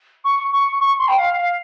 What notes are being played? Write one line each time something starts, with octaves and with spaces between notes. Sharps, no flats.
C#6
C#6
C#6
C6
G5
F5
F5